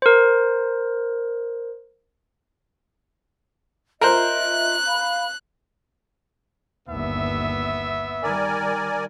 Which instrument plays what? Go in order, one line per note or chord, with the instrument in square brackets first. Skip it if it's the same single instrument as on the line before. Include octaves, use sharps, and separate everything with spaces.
[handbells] A#4 C5
[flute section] F4 D#5 E5 [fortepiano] A#4 C5 [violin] F#6
[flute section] F5 B5
[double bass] G1 D#2 [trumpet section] B3 E5
[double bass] D#3 G3 [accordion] A#4 D5 G#5